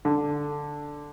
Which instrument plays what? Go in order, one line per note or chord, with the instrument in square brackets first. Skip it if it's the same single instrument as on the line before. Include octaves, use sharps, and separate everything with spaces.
[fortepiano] D3